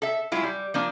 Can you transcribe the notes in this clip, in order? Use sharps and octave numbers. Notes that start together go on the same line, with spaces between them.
A4 E5
F#3 G#3 E4 F4
G3
F3 A#3 D4